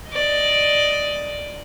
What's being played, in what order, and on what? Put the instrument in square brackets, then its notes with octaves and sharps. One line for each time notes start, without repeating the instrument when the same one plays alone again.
[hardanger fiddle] D5 D#5